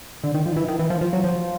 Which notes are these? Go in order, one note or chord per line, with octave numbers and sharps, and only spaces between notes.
D3
D#3
F3
D#3
E3
D#3
E3
F3
F3
F#3
F3